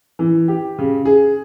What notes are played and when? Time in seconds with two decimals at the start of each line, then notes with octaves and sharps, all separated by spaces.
0.19 E3
0.48 G4
0.79 C#3
1.05 G#4